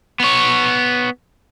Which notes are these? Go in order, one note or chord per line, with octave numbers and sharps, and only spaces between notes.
B3 C#5